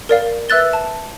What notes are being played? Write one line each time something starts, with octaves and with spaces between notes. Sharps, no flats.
A#4 D5 F5
B4 E5 E6 F#6 A6 G7
A5